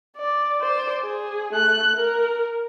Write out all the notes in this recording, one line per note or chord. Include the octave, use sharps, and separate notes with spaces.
D5
C5 D5
G#4
A3 F#6
A#4